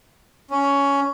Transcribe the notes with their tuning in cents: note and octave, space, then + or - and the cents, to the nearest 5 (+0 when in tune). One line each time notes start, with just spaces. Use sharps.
C#4 +10